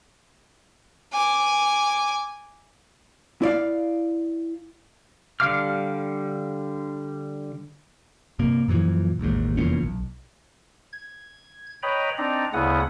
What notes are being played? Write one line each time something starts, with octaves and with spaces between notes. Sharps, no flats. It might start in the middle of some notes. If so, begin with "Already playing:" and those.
G#5 D6
E4 D5 F5
D3 G3 F5 D6 F6
G2 C3 A#3
F#2 A#2 E3 F3
E1 A1 D#2 G#2
F1 E2 A#2 C#4
B1
G#6
B4 C#5 D#5 G5 A#5 B5
C4 D4 D#4 D5 A#5
D2 C#3 B3 E4 F#5 D#6